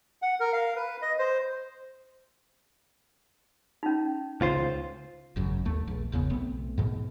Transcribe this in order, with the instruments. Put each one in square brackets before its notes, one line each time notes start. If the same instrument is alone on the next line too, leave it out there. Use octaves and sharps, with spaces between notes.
[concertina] F#5
A#4
F5
B4
D#5
C5
[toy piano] C#4 D#4
[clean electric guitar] C#2 F4 C5
[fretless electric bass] G#1 F#2 C#3
D#2 A3
A#1
G#1 E2 C#3 B3
B1 A3 B3 C4
G#2 B2